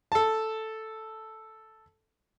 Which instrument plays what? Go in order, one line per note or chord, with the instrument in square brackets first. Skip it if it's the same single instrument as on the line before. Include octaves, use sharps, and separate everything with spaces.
[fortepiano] A4 A5